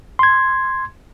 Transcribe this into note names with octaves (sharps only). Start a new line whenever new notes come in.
C6 G#6